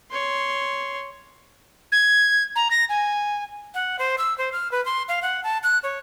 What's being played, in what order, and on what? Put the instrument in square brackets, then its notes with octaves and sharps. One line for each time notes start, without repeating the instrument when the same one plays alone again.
[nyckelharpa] C#5 C6
[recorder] G#6
A#5
A#6
G#5
[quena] F#5
C5
E6
C5
F6
B4
C6
F5
F#5
A5
F#6
C#5